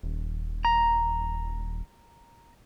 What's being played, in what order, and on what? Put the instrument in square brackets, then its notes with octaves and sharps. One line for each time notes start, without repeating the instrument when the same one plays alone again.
[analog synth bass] D#1
[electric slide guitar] A#5